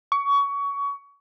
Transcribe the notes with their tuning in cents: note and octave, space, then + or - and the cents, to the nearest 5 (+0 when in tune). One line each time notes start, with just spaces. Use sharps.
C#6 +25